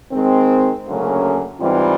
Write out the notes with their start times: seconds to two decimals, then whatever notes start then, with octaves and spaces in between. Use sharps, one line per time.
0.11 D#3 G#3 C4
0.86 D2 C#3 F#3 A#3 C#4
1.60 G#2 E3 G3 C4 F4